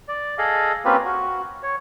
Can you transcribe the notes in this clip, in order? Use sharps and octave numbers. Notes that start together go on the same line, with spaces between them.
D5
G#4 A4 D#5 F5
A#3 C4 C#4 F4 G4 B4
F#4
C#5